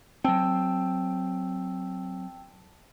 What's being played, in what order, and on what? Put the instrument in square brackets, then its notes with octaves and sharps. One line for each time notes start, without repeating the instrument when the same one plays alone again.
[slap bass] F#3 C4 [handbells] G5 A5 E6